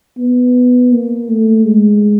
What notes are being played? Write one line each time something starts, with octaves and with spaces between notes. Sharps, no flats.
B3
A#3
A3
G#3